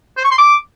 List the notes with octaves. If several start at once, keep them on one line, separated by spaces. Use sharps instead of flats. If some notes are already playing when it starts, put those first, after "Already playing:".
C5
C#6
C6
D6